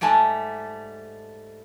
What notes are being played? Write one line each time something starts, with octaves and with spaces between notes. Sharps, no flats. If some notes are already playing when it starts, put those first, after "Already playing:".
G#2 G3 A3 G#5 A5